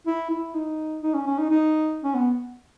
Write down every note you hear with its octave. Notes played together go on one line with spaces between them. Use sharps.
E4
E4
D#4
D#4
C#4
C#4
D#4
D#4
C#4
B3